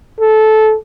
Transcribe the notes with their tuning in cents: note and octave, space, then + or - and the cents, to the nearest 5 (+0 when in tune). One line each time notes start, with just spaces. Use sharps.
A4 -15